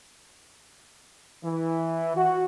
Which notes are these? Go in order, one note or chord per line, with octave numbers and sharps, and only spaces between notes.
E3
F#4